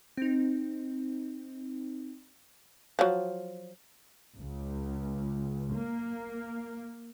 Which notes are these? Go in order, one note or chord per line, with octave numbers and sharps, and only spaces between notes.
C4 D#4
F3 F#3
C#2
A#3